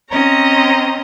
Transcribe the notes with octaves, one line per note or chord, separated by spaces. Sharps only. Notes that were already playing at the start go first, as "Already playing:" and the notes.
C4 C#4 C#5 D#5 A#5